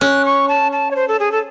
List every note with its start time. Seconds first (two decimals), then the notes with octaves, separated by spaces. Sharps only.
0.01 C#4 F#6
0.25 C#6
0.48 A5
0.72 A5
0.91 C#5
0.96 C5
1.08 A4
1.20 G#4
1.32 A4